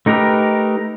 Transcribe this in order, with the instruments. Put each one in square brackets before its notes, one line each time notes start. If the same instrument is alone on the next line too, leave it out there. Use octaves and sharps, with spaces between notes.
[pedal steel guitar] A3 D#4 G4 A#4 B4